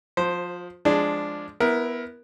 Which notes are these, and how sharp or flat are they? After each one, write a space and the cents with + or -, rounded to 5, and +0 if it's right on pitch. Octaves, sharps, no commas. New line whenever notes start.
F3 +25 C5 +0
F3 +0 G#3 +0 D4 +0
B3 +0 E4 +0 A#4 +20